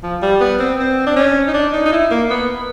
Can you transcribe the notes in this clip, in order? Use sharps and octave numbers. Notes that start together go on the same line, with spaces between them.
F3
G3
B3
C4
C4
D4
C#4
D#4
D4
D#4
D#4
E4
A#3
B3
B3